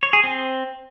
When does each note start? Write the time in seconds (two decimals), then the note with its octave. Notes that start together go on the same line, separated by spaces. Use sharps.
0.03 C#5
0.13 G#4
0.24 C4